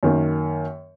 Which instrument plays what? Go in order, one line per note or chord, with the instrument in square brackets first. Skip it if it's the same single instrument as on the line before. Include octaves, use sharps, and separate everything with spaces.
[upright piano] F#2 D#3 A#3